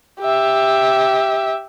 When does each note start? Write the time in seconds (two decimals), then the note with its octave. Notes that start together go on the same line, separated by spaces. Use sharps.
0.21 G4 E5